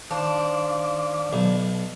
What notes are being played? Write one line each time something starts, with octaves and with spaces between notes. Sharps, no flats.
D#3 D4 C5 F5 D6
B1